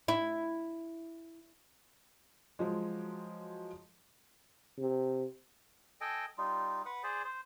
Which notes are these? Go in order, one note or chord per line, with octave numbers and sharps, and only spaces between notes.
E4
F3 F#3 G#3
C3
A4 D#5 G5 G#5
G3 D#4 F4
B4 F#5
G#4 C5 D5
C5